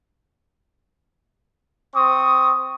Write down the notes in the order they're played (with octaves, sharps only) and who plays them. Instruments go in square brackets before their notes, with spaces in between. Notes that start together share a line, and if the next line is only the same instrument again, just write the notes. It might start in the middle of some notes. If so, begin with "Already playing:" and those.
[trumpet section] C4 C#6 D#6